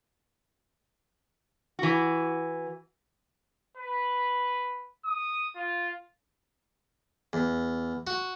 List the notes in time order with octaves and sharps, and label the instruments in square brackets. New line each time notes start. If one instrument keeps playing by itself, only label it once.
[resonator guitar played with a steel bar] E3 F#4
[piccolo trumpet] B4
D#6
F4
[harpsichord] E2
F#4